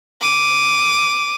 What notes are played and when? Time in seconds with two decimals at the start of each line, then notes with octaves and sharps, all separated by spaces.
0.21 D6 D#7